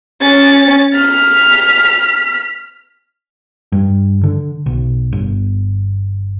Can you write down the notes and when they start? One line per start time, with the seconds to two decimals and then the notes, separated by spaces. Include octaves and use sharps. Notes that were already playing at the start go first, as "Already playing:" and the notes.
0.21 C#4 A6
0.94 F6 B6
3.72 G2
4.23 D3
4.66 B1
5.12 G1